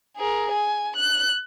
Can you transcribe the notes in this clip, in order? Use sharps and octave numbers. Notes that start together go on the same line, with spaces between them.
G#4 A#4
G#5
F#6